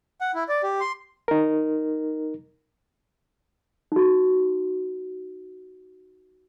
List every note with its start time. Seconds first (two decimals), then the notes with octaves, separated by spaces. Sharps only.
0.21 F#5
0.35 E4
0.49 D5
0.63 G4
0.80 C6
1.28 D#4 A#4
3.92 D#4 F#4